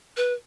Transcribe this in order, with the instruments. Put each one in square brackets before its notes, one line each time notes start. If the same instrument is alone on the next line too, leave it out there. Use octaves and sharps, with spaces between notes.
[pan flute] B4